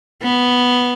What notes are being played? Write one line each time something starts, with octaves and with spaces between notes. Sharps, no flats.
B3